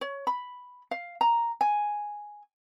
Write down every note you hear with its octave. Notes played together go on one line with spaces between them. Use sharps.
C#5
B5
F5
A#5
G#5